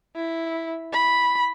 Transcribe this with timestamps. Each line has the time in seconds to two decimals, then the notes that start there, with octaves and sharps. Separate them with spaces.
0.16 E4
0.93 B5